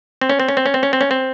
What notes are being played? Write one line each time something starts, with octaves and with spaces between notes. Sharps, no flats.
C4
C#4
C4
C#4
C4
C#4
C4
C#4
C4
C#4
C4